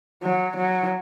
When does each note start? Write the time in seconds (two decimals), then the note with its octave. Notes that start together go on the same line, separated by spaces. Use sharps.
0.23 F#3
0.56 F#3